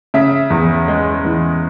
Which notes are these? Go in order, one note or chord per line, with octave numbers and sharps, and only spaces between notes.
C#3 E5
E2
G#3
E3